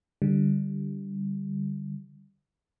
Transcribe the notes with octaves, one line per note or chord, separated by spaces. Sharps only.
D3 G3